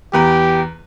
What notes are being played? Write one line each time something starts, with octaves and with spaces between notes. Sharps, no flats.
E2 G4 B4 A#5